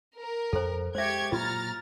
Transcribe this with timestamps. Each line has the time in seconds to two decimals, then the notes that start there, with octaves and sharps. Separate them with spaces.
0.18 A#4
0.53 F2 A4 C5
0.95 G#3 G4 C5 E5 C#6 G#6
1.32 A#2 F#3 F4 A#5 B5 F6 A6